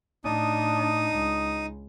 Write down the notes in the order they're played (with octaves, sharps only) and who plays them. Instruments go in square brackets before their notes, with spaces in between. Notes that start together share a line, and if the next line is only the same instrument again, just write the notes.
[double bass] A2 D4 [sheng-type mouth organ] D#4 D#6
[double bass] C#2